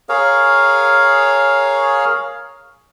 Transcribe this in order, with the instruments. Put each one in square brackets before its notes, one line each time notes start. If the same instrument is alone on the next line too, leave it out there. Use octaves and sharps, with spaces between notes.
[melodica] G#4 A#4 C#5 F5